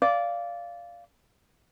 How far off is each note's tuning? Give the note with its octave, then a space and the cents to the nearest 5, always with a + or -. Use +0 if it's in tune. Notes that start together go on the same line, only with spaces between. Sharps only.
D5 -15 F5 -10